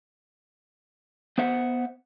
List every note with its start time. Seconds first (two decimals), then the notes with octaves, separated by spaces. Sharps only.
1.38 B3 C5 E5 F#5